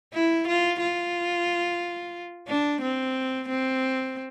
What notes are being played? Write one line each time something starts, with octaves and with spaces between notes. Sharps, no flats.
E4
F4
F4
D4
C4
C4